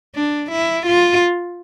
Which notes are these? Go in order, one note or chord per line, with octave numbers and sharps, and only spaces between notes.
D4
E4
F4